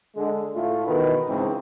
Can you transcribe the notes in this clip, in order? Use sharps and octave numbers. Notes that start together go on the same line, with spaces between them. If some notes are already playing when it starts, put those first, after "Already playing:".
D3 G#3
A2 A3 F4
B2 D#3 E3 B4
C#2 G#2 E3 C4